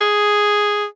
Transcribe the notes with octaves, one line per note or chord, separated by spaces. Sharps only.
G#4